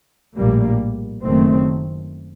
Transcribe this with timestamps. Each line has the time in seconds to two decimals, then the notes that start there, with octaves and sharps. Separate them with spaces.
0.35 A#1 A2 G3 A#3
1.24 F#1 F#2 D#3 A3 C4